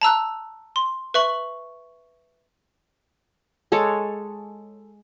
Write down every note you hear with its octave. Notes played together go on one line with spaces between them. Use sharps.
A5 A#5 E6 F#6
C6
B4 E5 C#6 F#7
G#3 A4 C#5